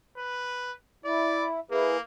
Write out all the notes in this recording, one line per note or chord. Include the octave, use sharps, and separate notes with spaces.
B4
E4 D5
A#3 E4 G#4 B4